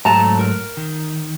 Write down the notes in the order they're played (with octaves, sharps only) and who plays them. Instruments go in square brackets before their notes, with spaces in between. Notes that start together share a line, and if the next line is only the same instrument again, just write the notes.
[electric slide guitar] G#2 F#3 A3 [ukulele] A5 A#5
[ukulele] A#4
[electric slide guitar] D#3